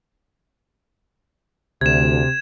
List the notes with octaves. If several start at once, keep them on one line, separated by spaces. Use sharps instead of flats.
D2 C3 G#6 E7